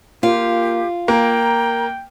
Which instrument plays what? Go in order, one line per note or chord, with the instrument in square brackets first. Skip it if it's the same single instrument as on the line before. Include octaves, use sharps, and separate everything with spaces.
[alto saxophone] A#3 [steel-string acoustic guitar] F4 [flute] G4
[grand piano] A#3 [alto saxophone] G5 [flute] A#5